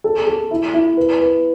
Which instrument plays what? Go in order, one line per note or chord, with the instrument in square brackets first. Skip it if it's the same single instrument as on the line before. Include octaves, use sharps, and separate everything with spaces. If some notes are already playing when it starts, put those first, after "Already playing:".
[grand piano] A4
A4
E4
E4
B4
B4